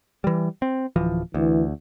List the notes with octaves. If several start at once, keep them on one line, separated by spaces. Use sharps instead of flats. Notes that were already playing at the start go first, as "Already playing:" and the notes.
E3 G3
C4
D1 E3 F3
D2 E3